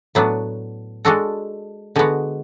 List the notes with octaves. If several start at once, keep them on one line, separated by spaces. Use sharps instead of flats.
A2 F#3 B3 D4
G#3 D4 F#4 A4
D3 G#3 B3 F#4